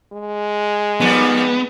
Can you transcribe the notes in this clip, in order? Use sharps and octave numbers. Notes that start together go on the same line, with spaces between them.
G#3
D#3 F3 G3 B3